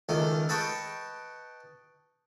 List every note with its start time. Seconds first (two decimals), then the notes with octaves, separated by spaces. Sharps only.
0.09 C#2 D#3 A3 D#4
0.49 B4 D#5 G5 A5 C#6